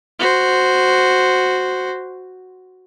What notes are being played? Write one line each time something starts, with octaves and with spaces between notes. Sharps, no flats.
F#4 C5